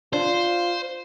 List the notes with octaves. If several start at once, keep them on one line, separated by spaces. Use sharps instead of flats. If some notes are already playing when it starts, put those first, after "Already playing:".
D4 F4 C5